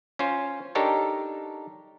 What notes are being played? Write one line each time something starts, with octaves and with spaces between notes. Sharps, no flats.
C#4 F4 C5
D4 D#4 G4 A4 A#4 C#5